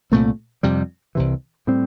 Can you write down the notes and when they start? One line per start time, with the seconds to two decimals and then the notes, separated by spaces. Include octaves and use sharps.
0.12 C2 A#2 A3 C4
0.63 F2 C3 G3
1.15 C2 C3 E3
1.67 A2 G3 C4